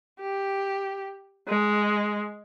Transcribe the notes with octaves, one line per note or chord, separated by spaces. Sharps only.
G4
G#3